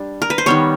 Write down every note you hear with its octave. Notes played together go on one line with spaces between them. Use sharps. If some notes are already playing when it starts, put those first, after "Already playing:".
Already playing: G3 D4
A#4
B4
C5
D#3 G3 B3 C#5